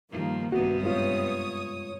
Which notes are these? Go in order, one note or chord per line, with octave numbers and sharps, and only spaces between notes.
G2 D#3 F3 A#3
A#1 G2 C3 B3 F#4
F#2 G#3 F4 C#5 D#6